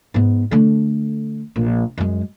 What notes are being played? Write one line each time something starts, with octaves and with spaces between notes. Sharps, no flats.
G#2 B3
D3 A3
A#1
F#2 G#3